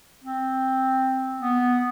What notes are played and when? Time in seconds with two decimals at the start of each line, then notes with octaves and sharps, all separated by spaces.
0.23 C4
1.40 B3